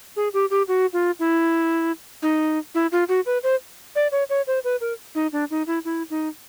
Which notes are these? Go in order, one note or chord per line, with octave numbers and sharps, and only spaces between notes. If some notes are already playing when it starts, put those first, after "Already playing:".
G#4
G4
G4
F#4
F4
E4
D#4
E4
F4
F#4
B4
C5
D5
C#5
C#5
C5
B4
A#4
D#4
D4
D#4
E4
E4
D#4